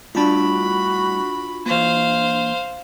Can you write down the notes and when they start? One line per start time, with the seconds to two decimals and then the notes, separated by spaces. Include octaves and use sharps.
0.15 A2 G3 D4 F4 F#4 A5 B5
1.66 E3 A#3 C5 F5